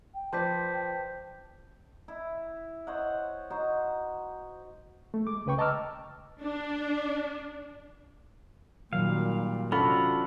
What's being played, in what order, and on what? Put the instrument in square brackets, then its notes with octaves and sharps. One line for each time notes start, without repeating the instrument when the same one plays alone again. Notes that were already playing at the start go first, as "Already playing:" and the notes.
[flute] G5
[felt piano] F3 B4 [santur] C5 D5 [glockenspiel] A5 G6 B6
[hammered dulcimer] E4
C5 C#5 D#5 F#5
D#4 F#4 C5
[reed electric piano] A3
G#3 D6
C#2 C#3 B4 G5 C#6
D#5 A5 A#5 D6 E6 F6
[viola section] D4
[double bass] A#2 G3 [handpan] D#3 F#3 [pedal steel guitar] F5
[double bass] C3 D4 [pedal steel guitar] C#4 F4 F#4 [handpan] A4 [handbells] B5